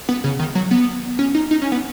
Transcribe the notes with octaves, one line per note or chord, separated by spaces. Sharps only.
B3
C#3
D#3
F#3
B3
C#4
D#4
D#4
C#4
B3